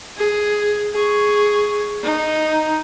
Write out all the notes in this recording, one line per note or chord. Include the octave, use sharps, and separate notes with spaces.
G#4
G#4 C#6
D#4